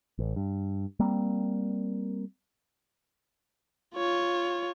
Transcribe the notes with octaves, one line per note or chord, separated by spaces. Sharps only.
A1
G2
G3 A#3 C4
F4 C#5